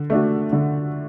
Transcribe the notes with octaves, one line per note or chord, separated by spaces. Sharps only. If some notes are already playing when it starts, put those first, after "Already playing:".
Already playing: D3
A3 D4 F#4
D3